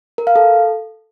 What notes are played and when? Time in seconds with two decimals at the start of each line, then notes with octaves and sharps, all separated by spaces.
0.18 A#4
0.27 F5
0.36 A4